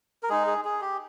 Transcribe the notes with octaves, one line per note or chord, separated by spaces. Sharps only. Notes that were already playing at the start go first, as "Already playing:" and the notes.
A#4
G#3 D#4 G#4
G#4
G#4
G4